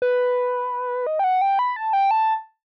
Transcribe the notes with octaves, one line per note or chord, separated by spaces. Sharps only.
B4
D#5
G5
F#5
G5
B5
A5
G5
A5